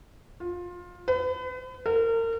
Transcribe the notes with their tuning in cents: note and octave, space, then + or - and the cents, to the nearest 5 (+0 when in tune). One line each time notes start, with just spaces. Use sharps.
F4 +20
B4 +35
A#4 -35